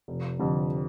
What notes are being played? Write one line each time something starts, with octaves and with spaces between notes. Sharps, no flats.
F1
F2 D3 G3